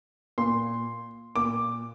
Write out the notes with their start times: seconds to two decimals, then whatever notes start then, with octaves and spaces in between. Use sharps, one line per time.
0.38 A#2 C6
1.36 A#2 D6